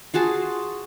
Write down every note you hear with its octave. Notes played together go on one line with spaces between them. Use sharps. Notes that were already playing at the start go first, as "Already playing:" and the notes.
F4 F#4 G#4 A5